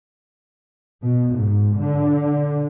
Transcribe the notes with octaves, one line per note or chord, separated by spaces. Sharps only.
B2
G#2
D3